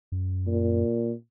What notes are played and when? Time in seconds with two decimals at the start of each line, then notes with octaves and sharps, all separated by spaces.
0.12 F#2
0.47 A#2